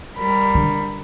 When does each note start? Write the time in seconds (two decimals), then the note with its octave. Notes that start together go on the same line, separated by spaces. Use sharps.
0.17 G3 A#4 B5
0.55 D3